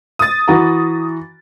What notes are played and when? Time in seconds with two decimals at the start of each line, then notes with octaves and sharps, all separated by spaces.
0.19 D#6 A6
0.48 E3 F#4 A#5